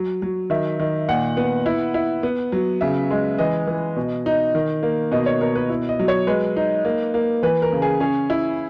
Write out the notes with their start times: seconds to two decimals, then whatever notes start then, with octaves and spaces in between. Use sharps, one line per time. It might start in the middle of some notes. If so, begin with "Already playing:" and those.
Already playing: F#3
0.22 F#3
0.50 D#3 E5
0.80 D#3
1.08 A#2 F#5
1.37 B3
1.66 E4
1.94 E4
2.23 B3
2.52 F#3
2.81 C#3 E5
3.11 G#3
3.38 E3 D#5
3.67 E3
3.96 B2
4.26 D#4
4.55 D#3
4.83 A#3
5.12 B2 D#5
5.26 C#5
5.41 B2 A#4
5.55 B4
5.69 E4
5.89 D#5
5.99 F#3
6.08 C#5
6.27 G#3 B4
6.56 D#4
6.85 A#3
7.14 A#3
7.43 E3 B4
7.62 A#4
7.73 C#3
7.82 G#4
8.00 C#4 G#4
8.30 E4